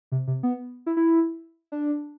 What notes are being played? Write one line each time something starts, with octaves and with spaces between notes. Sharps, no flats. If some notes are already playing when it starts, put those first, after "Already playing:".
C3
C3
B3
E4
E4
D4